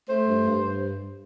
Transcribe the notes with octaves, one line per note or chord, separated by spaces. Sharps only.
A3 C5
G2
G2